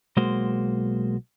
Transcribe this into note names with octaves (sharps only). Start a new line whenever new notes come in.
B1 G#3 A#3 F#4 C5